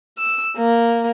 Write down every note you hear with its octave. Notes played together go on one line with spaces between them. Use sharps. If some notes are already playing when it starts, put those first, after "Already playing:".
E6
A#3